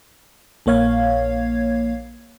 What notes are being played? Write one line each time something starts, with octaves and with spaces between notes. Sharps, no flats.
A#1 A#3 C#5 F5 G#6